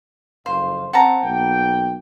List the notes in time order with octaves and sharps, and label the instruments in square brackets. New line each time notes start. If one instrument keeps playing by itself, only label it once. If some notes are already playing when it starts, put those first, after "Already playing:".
[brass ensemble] F#1 F2 F5 [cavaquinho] C5
[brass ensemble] C4 [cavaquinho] F#5 A5 A#5
[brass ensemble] B1 A#3 G5